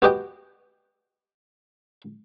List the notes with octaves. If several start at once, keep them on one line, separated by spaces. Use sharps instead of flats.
B3 F#4 G4 D#5 G5